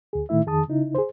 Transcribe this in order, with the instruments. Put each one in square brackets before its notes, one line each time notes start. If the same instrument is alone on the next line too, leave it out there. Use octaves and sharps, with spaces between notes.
[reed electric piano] D2 G#4
A2 D#3 A3 E4 E5
F2 D#3 G#4 A5 D#6
C#3 D#4 E4
G#4 C5